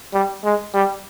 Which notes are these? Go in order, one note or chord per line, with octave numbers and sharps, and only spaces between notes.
G3
G#3
G3